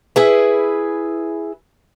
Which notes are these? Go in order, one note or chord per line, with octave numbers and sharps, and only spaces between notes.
E4 G#4 B4